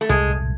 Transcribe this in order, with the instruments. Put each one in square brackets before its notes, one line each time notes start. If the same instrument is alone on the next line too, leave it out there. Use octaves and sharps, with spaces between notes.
[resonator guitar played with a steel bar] A3
[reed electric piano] C2 [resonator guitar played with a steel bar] G#3